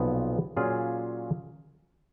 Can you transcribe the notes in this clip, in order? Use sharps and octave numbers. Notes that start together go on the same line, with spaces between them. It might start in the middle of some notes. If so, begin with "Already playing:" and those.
Already playing: B1 A#2 F3 B3
A#2 F#3 C#4 F4 G#4